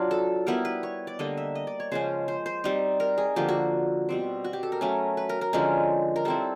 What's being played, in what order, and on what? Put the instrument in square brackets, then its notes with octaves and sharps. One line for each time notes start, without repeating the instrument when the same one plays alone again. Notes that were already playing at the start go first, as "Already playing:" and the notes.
Already playing: [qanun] F#3 D4 F4
A4
G3 B3 E4 A#4
B4
C#5
D5
D3 G3 A#3 D#5
E5
D#5
D5
C#5
C#3 F3 G#3 C#4 C5
C5
C5
G3 C4 D#4
A#4
G#4
D3 F3 A#3 G4
F#4
B2 G3 C4
F#4
G4
A4
A#4
F#3 A3 C#4
B4
A#4
A#4
D3 F3 G#3 C#4
A#4
G3 C4 E4 A4